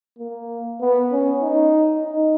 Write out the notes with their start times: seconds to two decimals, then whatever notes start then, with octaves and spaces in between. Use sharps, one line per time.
0.18 A#3
0.81 B3
1.12 C#4
1.42 D#4
2.05 D#4